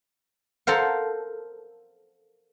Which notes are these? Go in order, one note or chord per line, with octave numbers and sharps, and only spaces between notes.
A4 A#4 C5 F5 F#5